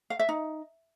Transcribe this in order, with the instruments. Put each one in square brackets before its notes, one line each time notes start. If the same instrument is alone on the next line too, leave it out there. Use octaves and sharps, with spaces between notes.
[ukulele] F5
E5
D#4